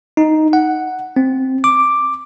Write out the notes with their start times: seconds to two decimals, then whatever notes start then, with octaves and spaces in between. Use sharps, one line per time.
0.17 D#4
0.53 F#5
1.16 C4
1.64 D6